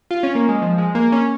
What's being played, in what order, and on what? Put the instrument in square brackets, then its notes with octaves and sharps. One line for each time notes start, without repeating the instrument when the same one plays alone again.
[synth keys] F4
C#4
A#3
G#3
F3
G#3
A#3
C#4